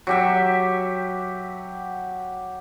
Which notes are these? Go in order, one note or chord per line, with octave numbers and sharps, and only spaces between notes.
F#3 G4 E5